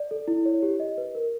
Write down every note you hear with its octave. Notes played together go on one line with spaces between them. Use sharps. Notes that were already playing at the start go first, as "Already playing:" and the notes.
Already playing: D5
A4
E4
C#5
G4
D#5
B4
A#4